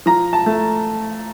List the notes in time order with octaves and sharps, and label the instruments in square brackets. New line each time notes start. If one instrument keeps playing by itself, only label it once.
[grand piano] F3 A#5
A5
A3